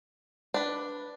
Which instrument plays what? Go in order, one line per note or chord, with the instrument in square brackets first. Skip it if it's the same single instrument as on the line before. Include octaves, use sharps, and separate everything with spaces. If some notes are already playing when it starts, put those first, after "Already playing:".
[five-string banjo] D4 B4